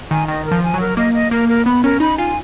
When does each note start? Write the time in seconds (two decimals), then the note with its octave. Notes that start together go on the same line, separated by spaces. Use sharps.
0.11 D#3 G#5
0.27 D#3 D#5
0.45 A#4
0.51 F3
0.63 G#5
0.74 F#3
0.80 A#4
0.97 A#3 D#5
1.14 D#5
1.31 A#3 A#4
1.49 A#4
1.66 B3 B5
1.84 C#4 A#4
2.00 D#4 B5
2.18 F4 G#5